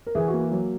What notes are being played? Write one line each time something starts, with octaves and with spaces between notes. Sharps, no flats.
A#4
E3 G#4
F#4
A#3
F#3